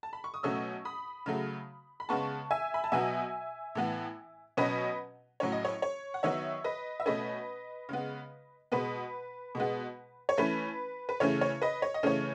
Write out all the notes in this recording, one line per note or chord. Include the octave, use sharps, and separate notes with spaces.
A5
B5
C#6
D#6
B2 F#3 A3 C#4 C#6 E6
B5 D#6
C#3 F#3 A3
B5
C#3 G#3 B3 A5 C#6
E5 G#5
B5
A5
B2 F#3 B3 E5 G#5
A2 E3 B3
B2 F#3 C#4 B4 D#5
A2 F#3 C#4 C#5
D#5
C#5
C#5
F#5
D#3 F#3 B3 C#5 E5
B4 D#5
E5
B2 A3 C#4 B4 D#5
C#3 G#3 B3
B2 G#3 B3 B4
B2 G#3 B3
C#5
E3 A3 C#4 B4
B4
C#3 E3 A3 C#4 C#5
C#5
B4 D#5
C#5
D#5
C#3 E3 A3 C#4 C#5